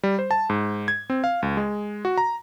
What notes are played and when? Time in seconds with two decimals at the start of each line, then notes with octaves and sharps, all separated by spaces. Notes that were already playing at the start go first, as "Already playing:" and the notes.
0.03 G3
0.19 C5
0.31 A5
0.50 G#2
0.88 G#6
1.10 C4
1.24 F5
1.42 C#2
1.57 G#3
2.05 F#4
2.18 A#5